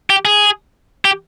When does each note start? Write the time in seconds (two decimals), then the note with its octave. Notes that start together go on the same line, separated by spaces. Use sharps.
0.10 G4
0.25 G#4
1.05 G4